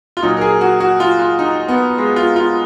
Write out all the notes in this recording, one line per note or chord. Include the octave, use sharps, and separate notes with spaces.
F4
A#2 F#3 D#4
A#4
G#4
F#4
F#4
F4
F4
D#4
B3
G#3
F4
F4